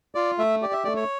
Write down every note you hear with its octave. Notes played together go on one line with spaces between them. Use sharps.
F4 D5
A3 E5
G4 D5
E5
A3 D5
C#5